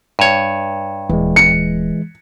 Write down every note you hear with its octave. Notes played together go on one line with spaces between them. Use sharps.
G2 C#5
D#1 E3 G#3
C#7